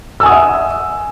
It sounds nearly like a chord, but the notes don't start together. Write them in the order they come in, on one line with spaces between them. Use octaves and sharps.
E6 G#5 D#6 F#5 E5